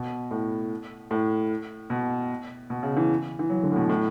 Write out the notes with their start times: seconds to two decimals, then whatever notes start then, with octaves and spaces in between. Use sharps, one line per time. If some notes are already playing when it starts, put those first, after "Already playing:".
Already playing: B2
0.31 A2
1.11 A2
1.90 B2
2.70 B2
2.83 C#3
2.97 E3
3.39 E3
3.50 F#3
3.63 D3
3.72 A2
3.76 B2
3.89 A2